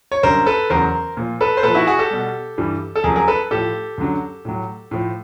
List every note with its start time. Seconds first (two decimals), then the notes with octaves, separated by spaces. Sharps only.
0.12 C#5
0.23 F#2 D3 G3 A#4 C5
0.46 A4 B4
0.70 E2 C#3 F#3 A#4 C5
1.17 A#2 F3
1.41 A4 B4
1.57 C5
1.63 A#2 F3 A4 B4
1.75 E4 F#4
1.87 F#4 G#4
1.99 G4 A4
2.11 B2 G3
2.58 G2 E3 G3
2.96 A4
3.04 F2 C#3 F#3 G#4 A#4
3.16 G#4 A#4
3.28 A4 B4
3.51 A2 F3 G4 A4
3.98 F#2 D3 F#3
4.45 A2 F#3
4.91 A2 F3